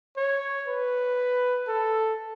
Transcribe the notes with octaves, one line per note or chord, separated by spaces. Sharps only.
C#5
B4
A4